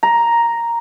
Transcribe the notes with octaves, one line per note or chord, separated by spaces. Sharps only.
A#5